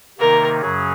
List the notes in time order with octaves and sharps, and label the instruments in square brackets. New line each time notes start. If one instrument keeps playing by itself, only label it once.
[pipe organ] C3 D#3 A#3 D#4 [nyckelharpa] A#4
[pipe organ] F#2 C#3 F#3 C#4 G#4